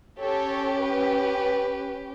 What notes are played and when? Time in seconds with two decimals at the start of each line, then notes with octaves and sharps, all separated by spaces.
0.20 C#4 G4 A4 C#5
0.79 B4